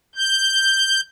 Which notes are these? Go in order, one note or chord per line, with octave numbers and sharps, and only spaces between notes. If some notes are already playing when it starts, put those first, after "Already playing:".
G6